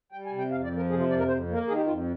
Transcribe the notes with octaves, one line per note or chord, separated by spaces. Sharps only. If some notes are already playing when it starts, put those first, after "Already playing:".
G3 G5
G#5
C3
G5
F2 F5
D5
F3
A#4
C3 G#4
F4
F2 D5
A#4
F2 C5
A#3
A#4
D#3 G#4
G4
F2 F4